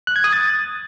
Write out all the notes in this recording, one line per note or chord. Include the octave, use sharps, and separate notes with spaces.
F#6
G#6
D#6
A6